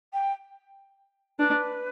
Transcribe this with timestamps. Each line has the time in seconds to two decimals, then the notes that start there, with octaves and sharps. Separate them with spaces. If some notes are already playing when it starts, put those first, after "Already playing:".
0.13 G5
1.39 D4 B4